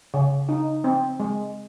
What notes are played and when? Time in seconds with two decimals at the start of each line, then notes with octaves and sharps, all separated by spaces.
0.14 C#3
0.49 D#4
0.84 C4
1.20 G#3